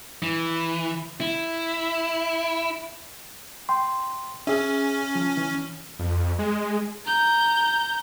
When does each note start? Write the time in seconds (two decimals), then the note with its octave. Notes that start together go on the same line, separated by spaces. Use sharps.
0.23 E3
1.21 E4
3.69 G5 C6
4.47 C#4 G#4 E5
5.15 F3
5.37 E3
5.99 F2
6.39 G#3
7.05 A#5 G6